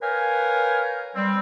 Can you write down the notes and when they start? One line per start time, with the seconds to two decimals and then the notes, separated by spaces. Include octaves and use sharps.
0.02 A#4 B4 C#5 F5 G5 G#5
1.16 G3 C4